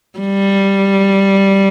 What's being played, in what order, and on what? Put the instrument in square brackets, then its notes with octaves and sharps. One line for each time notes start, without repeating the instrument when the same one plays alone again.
[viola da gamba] G3